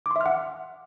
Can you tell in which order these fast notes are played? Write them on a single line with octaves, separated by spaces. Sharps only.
D6 C6 E5 F6 F#5